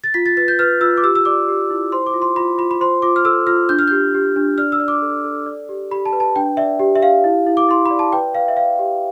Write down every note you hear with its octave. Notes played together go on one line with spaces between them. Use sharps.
A6
F4 B6
A6
B4 A6
G6
B4 F6
F4 E6
D6
G4 E6
E6
D5 D6
G4
E4
C5 C6
D6
F4
C6
F4 B5
F4 B5
B5
C5 C6
F4 D6
F6
A4 E6
F4 F6
D4 G6
F6
G4 G6
G4
D4
D5 F6
E6
D5
D6
A4
A4
D5
G4
G4 B5
A5
B4
A5
D4 G5
D5 E5
G4
E5
G4 F5
E4
E4
D6
E4 C6
B5
D5
A5
B4 G5
B4 F5
E5
D5 F5
G4